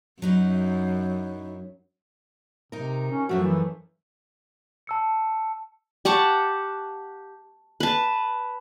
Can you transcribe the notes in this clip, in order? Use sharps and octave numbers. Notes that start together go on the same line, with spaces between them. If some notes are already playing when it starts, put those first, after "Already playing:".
F#2 F#3 D#4 E4
C3 D#4 A#4
C#4
F#2 F3 A3 F#4
E3
A5 E6 C#7
G4 F#5 A5 C#6
B4 A5